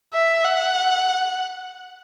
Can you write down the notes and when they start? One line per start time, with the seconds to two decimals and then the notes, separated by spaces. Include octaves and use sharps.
0.13 E5
0.44 F#5